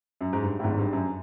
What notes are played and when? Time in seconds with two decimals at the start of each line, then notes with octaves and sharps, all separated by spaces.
0.21 F#2
0.33 G#2
0.43 G2
0.60 A2
0.64 G#1 G#2
0.79 G2
0.93 F#2